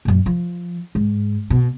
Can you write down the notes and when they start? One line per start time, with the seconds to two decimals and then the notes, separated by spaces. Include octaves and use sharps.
0.05 F#2 A#2
0.26 F3
0.95 G#2
1.50 B2